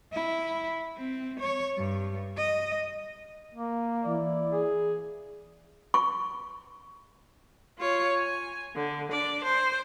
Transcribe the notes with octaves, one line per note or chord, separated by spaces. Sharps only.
E4
C4
C#5
G2
D#5
A#3
E3 E4 D5
G#4
C#6
F4 C#5
G#5
D3
D4 D5
C5